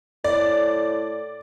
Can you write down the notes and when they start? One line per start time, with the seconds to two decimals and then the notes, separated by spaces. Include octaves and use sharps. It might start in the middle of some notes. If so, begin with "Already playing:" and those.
0.24 A2 D5